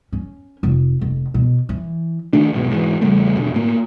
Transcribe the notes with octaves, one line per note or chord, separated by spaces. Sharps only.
C#4
F1
F1
B2
E3
D3 D#3 A3 D4
F1 B1 G#2 B2
G#2 E3
E2 C#3 G3 A3
E2 B2 D3
A2 A#3